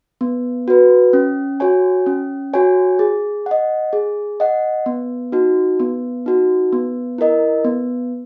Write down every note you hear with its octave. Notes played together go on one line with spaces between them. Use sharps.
B3
F#4 B4
C#4
F#4 C#5 G#5
C#4
F#4 C#5 G#5
G#4
D#5 F#5
G#4
D#5 F#5
B3
D#4 F#4
B3
D#4 F#4
B3
E4 A#4 D#5
B3